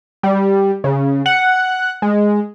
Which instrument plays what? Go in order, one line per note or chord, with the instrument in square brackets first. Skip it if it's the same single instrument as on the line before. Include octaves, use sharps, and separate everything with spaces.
[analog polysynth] G3
C#3
F#5
G#3